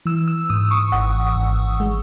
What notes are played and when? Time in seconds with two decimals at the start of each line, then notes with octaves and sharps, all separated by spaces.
0.06 E3 E6
0.28 E6
0.50 G#2 D#6
0.71 C#6
0.92 G#1 F#5
1.36 G#1
1.80 G#3